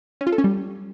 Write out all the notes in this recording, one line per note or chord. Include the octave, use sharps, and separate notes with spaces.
C#4
F4
A4
C#4
G3